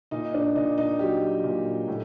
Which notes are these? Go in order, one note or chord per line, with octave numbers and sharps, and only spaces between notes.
A#2 D#4
D4
A#2 D#4
D#4
F#3 G4
A#2
A2